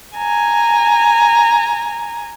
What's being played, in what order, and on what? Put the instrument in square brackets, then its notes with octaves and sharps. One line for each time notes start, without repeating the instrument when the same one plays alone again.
[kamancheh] G#5 A#5